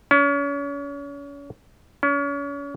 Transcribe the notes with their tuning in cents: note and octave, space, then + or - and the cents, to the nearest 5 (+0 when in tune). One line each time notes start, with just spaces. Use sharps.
C#4 +35
C#4 +35